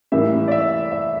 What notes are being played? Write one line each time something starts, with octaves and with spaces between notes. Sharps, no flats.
A2 E3 G3 A#3 E5
D5
E5
E5